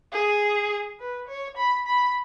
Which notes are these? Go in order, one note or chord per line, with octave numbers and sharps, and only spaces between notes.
G#4
B4
C#5
B5
B5